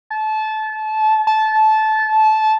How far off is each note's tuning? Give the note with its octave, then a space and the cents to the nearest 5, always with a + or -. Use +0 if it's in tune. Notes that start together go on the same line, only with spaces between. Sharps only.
A5 -25
A5 -20